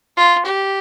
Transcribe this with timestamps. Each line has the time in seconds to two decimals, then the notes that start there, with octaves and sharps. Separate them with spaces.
0.17 F4
0.45 G4